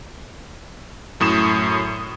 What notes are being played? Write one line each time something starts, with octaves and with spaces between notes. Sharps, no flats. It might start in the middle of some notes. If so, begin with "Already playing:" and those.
F#2 A2 D#6 E7